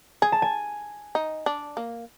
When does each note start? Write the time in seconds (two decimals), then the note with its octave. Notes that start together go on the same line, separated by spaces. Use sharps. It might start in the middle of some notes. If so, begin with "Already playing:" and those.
0.22 G#4 G#5
0.32 A5
0.42 G#5
1.15 D#4
1.46 D4
1.77 A#3